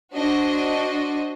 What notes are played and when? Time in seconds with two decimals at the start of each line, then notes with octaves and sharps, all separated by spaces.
0.13 D4 F#4 C5 D#5